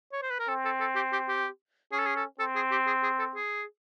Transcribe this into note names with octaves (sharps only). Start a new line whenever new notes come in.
C#5
C5
B4
A#4
C4 A4
A4
A4
G4
G4
G4
C#4 G#4
A4
G#4
A4
C4 A4
G#4
G4
G#4
G#4
A4
G#4